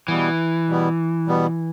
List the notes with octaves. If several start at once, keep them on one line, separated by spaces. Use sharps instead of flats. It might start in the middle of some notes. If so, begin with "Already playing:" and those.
B2 E3 G3 B3
B2 G3 B3
B2 G3 B3